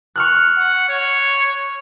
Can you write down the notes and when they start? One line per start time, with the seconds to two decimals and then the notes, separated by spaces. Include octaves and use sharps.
0.16 C#6 F6 F#6
0.58 F#5
0.89 C#5